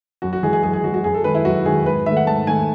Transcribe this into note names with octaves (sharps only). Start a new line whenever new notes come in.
F#2 F#4
F#4
E3 G#3 G#4
G#4
F#2 G#4
G#4
E3 G#3 F#4
F#4
F#2 G#4
A4
D#3 G#3 B4
E4
F#2 F#4
D#3 G#3 G#4
G#2 B4
D#3 A3 E5
F#5
G#2 A5
D#3 A3 G#5